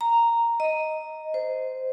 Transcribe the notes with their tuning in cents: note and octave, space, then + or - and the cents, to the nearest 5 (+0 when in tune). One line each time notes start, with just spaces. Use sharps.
A#5 -5
D#5 +5
C5 -15